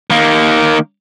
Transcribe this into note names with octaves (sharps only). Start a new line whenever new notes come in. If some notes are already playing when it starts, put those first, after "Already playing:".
D#3 A#3